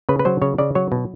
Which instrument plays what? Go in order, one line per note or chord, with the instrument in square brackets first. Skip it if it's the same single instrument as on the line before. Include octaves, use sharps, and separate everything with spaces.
[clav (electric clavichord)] C#3 B4
B4
F#3 C5
C#3 C#5
C#3 D5
F#3 C#5
B2